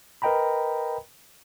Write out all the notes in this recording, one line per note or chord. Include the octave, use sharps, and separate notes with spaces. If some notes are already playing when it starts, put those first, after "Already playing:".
A#4 B4 D#5 G5 A#5 B5